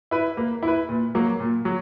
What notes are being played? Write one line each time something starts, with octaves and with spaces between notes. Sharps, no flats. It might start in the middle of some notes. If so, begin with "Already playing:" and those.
E4 B4
A#3
E4 B4
A#2
F#3 A#3
A#2
F#3